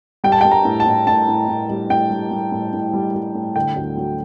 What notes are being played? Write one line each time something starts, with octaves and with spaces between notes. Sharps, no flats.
G3 G5
A5
G5
G3
A#5
A2
A5
A2
A2 A5
A2
A2
G3
A2 G5
G3
G3
A2
A2
G3
G3
A2
D3 G5
D2
F#3